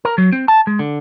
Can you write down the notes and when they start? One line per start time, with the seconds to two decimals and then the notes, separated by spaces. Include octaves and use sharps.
0.05 A#4
0.18 F#3
0.32 C4
0.48 A5
0.67 G#3
0.79 D3